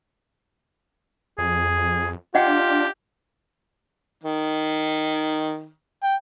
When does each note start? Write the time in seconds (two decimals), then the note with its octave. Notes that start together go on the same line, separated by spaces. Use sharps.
1.38 F2 G#4
2.35 D4 F4 G4 D#5 F#5 G5
4.23 D#3
6.04 G5